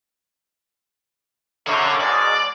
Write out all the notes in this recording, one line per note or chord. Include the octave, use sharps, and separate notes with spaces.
F#2 D3 C#5 F5
G#2 B2 G#3 D5